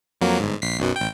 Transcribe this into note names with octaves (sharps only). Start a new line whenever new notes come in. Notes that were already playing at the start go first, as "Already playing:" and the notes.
F2 F#3 A#3
G1 G#2
A#1 B6 C7
B1 F#2 B2
A1 G5